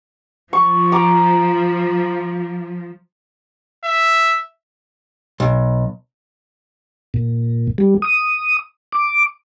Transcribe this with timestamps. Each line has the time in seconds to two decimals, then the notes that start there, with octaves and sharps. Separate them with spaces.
0.53 F3 C#6
0.92 A#5 D6
3.84 E5
5.40 B1
7.14 A#2
7.78 G3
8.02 D#6
8.92 D6